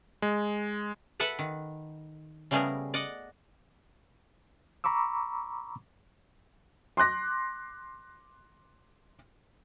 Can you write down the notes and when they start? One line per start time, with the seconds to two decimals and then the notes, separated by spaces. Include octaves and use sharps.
0.22 G#3
1.20 A4 B4 E5 F#5 A5
1.39 D#3
2.51 C#3 G3 A3 B3 G#4 A#4
2.94 D5 D#5 F#5
4.84 A#5 B5 C#6 D6 E6
6.97 C6 D6 F#6 A#6